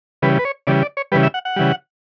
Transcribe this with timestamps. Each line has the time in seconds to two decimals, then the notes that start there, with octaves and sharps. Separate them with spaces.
0.22 C#3 E3 G3 B4
0.39 B4
0.45 C#5
0.67 C#3 E3 G3 D5
0.82 D5
0.97 C#5
1.12 C#3 E3 G3 B4
1.23 E5
1.34 F#5
1.45 F#5
1.56 C#3 E3 G3